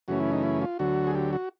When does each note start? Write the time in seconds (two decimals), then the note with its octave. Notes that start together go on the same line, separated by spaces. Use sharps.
0.08 F#2 C#3 E3 A3 C#4 F#4
0.20 E4
0.32 D#4
0.43 E4
0.61 F4
0.79 D2 D3 F#3 F#4
1.07 G#4
1.15 G4
1.33 F#4